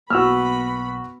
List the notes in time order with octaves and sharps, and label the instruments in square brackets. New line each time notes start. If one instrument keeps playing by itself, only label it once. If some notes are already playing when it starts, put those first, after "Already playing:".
[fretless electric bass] B1 A#3 [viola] B3 B5 [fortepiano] F#4 E6 F6